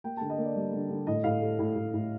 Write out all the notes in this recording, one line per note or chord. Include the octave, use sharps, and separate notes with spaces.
A#3 G5
D3 A5
D#5
A#3
D5
G3
D3
D3
A2 D#5
A2 F5
A3
A2
A2
A2